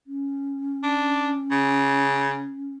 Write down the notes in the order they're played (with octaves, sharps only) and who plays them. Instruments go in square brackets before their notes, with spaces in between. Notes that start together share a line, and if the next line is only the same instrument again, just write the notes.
[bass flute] C#4
[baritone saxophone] D4
C#3